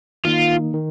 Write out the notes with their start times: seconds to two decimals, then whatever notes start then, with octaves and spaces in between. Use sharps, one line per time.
0.25 D#3 A#3 D#4 F4
0.74 D#3